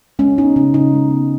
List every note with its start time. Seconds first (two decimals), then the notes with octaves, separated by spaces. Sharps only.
0.19 G#3 C#4
0.38 B3 D#4
0.56 C#3 C#4
0.74 C#3 D#4
0.93 G#3
1.11 B3